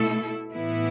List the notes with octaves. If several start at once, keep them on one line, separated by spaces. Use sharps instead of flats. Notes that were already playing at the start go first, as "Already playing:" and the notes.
Already playing: B2 A3 E4 A4
A2 E3 B3 E4